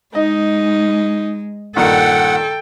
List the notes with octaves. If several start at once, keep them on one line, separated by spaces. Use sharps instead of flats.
G#3 D#4 D#5
G2 A#2 D#3 A4 F#5 G5